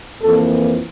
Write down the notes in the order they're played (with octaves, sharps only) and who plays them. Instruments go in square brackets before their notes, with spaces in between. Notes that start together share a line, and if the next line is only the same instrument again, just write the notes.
[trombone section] F2 E3 A#3 A4